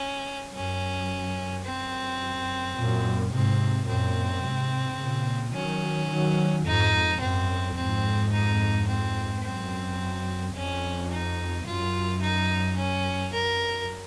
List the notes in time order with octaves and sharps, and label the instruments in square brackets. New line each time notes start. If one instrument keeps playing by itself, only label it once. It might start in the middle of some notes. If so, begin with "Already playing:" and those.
Already playing: [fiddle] C#4
[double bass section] F#2 [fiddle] C#4
[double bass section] F#2 [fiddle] C4
[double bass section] F#2 A#2
[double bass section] G#2 C3 [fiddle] C4
[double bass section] F#2 A#2 [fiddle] C4
[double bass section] G#2 C3
A#2 C#3
[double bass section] D#3 F#3 [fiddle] C#4
[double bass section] D#3 F#3
[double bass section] F2 G#2 [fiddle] D#4
[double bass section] F#2 [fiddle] C4
[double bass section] F2 G#2 [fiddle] C4
[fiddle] D#4
C4
[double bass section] F#2 [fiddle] C4
[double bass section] F2 [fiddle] C#4
[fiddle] D#4
[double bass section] F#2 [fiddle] F4
[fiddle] D#4
C#4
[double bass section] F#2 [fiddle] A#4